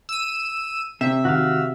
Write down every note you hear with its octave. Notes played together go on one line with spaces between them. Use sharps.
E6 D#7
C3 E5
D#3 F#4 F5